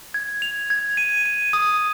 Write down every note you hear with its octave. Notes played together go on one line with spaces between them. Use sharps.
G#6
F7
G#6
D#7
D#7
D#6